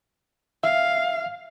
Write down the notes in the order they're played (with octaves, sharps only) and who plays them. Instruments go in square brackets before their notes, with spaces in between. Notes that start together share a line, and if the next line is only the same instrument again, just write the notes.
[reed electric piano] E5 [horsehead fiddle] F5